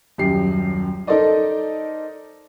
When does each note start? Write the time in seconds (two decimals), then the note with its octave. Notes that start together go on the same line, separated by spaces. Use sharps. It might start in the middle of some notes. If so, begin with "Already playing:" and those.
0.18 D#1 F#2 G4 C7
1.07 D#4 A4 A#4 C5 D5 D#5